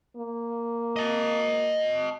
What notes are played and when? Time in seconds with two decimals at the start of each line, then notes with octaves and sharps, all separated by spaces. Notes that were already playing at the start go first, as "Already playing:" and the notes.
0.17 A#3
0.96 D#5 A5